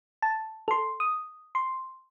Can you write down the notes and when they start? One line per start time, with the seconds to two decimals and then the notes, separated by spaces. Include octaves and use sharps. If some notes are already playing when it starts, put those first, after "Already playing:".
0.22 A5
0.68 A4 C6
1.00 D#6
1.55 C6